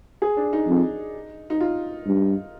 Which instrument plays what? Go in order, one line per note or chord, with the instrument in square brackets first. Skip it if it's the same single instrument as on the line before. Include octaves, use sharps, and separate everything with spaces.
[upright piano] G#4
D4
D#4
[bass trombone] F2
[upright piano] D#4
F4
[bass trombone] G2